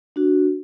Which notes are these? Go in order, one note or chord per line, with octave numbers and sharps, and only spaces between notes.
D4 F#4